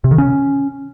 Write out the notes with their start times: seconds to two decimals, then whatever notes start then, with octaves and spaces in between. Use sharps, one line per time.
0.04 C3
0.11 D#3
0.18 C#4